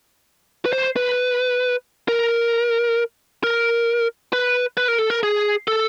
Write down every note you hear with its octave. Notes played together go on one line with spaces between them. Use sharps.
B4
C5
B4
A#4
A#4
B4
B4
A#4
A4
A#4
G#4
A4